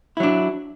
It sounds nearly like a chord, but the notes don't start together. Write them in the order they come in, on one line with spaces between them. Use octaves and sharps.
E4 F#3 D4